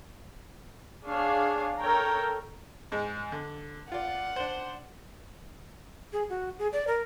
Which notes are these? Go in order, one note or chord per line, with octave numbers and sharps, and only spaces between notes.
D4 G#4 C#5 F5
A4 A#4 C#5 G5 A#5
G#2 G#3
D3
F4 D5 F#5
D4 C5
G#4
F#4
G#4
D5
A#4